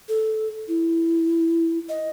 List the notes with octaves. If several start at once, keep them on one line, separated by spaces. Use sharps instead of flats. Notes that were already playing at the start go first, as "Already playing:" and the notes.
A4
E4
D#5